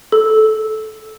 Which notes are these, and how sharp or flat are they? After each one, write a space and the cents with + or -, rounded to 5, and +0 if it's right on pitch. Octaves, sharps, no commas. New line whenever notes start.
A4 -15